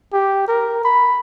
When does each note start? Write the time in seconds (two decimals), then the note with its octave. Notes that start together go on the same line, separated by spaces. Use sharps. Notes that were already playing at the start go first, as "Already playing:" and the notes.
0.13 G4
0.48 A#4
0.85 B5